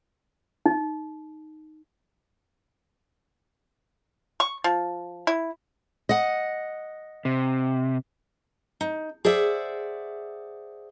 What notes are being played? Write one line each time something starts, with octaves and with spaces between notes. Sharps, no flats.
D#4
C#6
F3
E4
D#5 F#5
C3
D#4
G#4 C5 D5 E5 F#5